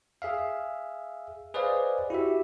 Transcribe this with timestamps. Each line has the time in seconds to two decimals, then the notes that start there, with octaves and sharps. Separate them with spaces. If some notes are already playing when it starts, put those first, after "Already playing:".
0.22 G#4 E5 F5
1.54 G#4 B4 C5 D5 D#5 F5
2.10 E4 F#4 G4 E5